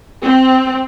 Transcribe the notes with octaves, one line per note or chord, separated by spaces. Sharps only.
C4